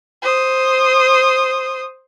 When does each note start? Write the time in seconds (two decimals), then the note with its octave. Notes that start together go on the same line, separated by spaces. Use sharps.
0.22 C5 D#6